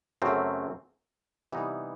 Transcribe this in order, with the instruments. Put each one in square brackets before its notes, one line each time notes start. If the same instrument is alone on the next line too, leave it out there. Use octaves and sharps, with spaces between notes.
[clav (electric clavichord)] F#2 C#3 F#3 A3 C4
C3 E3 G3 B3 D#4